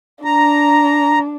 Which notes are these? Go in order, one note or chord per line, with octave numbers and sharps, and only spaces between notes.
D4 A#5